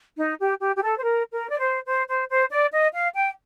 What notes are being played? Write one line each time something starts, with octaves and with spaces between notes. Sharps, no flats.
D#4
G4
G4
G4
A4
C5
A#4
A#4
D5
C5
C5
C5
C5
D5
D#5
F5
G5